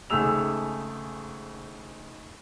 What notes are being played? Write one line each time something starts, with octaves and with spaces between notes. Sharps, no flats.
G#1 C#3 A3 G#4 E6 F7